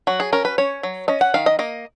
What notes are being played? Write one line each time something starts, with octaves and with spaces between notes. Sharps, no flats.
F#3 F#4
G#4
C#4 A#4
B4
C#4 C#5
F#3
C#4 D#5
F#5
D#3 F5
D#5
A#3 D#5